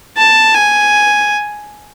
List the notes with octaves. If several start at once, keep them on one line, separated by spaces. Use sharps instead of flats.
A5
G#5